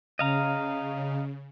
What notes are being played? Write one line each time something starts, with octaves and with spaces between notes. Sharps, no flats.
C#3 D#5 F5 A#5